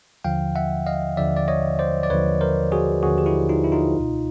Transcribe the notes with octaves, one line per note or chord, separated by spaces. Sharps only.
D#2 D3 F3 F5 G5
E5 F#5
D#5 F5
D#2 D3 F3 D5 E5
D5
C#5 D#5
C5 D5
D5
D#2 D3 F3 B4 C#5
A#4 C5
F#4 G#4
D#2 D3 F3 F#4 G#4
G4
E4 F#4
D#4 F4
E4
D#4 F4
C#2 B2